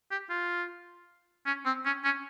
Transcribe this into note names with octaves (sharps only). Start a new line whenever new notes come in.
G4
F4
C#4
C4
C#4
C#4